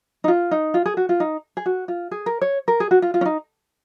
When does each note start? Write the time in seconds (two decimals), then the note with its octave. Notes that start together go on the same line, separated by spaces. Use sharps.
0.24 D#4
0.28 F4
0.51 D#4
0.74 F4
0.86 G#4
0.97 F#4
1.09 F4
1.20 D#4
1.57 G#4
1.66 F#4
1.88 F4
2.11 G#4
2.26 A#4
2.42 C#5
2.68 A#4
2.80 G#4
2.91 F#4
3.02 F4
3.14 F4
3.21 C#4
3.25 D#4